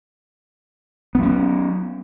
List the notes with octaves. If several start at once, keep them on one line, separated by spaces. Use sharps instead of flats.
F#3 B3 C#4